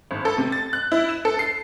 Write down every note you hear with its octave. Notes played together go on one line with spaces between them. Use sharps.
G#1
A4
C3
A6
F#6
E4
E7
A4
C7